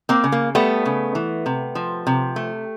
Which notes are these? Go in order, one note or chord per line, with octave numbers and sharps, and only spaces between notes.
A#3 C4
C#3
A#3
G3 A3 B3
C#3
E3
C3
F3
C3
A3